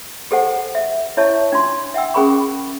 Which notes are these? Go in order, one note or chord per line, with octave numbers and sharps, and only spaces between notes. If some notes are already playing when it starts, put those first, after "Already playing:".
G4 A4 C5 F#5 G#5
E5
E4 C#5 E5 A5 C#6
D4 F4 C6
E5 F#5 G5 E6
C#4 G#4 A#4 B5 C#6